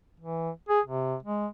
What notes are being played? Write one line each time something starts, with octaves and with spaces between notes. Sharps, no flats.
E3
G#4
C3
G#3